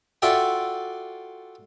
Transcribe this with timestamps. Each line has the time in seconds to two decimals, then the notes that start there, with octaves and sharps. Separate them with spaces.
0.22 F4 F#4 A4 D5 E5 G5